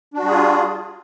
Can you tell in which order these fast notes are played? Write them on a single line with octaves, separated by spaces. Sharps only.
D4 F#4 G3 G#4 F4